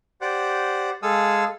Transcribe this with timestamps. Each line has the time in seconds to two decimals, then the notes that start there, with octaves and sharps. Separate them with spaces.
0.21 G4 C5 D5 F#5
1.03 G#3 G#4 A4 F5 D#6 E6